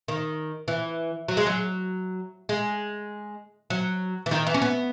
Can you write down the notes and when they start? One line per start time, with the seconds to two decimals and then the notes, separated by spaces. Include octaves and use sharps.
0.08 D#3
0.68 E3
1.28 F#3
1.37 G#3
1.47 F#3
2.49 G#3
3.70 F#3
4.26 E3
4.31 D#3
4.47 E3
4.54 C#4
4.62 B3